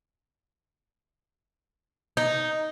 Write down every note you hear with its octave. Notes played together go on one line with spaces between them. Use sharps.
D#4